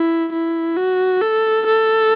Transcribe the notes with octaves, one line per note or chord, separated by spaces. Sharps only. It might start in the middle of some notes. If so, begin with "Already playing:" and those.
Already playing: E4
E4
F#4
A4
A4